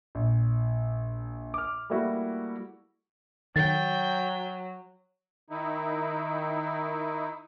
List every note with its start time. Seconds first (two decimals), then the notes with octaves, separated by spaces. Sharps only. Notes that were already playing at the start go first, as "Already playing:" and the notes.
0.15 A#1
1.54 D6 F6
1.90 G3 A3 A#3 E4 F#4
3.56 D#3 F#3 G5 A6
5.50 D#3 D#4 E4